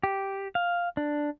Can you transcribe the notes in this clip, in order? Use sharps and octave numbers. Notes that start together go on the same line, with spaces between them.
G4
F5
D4